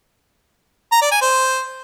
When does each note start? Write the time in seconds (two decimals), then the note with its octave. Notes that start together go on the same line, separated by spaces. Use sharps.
0.92 A#5
1.02 D5
1.12 G#5
1.22 C5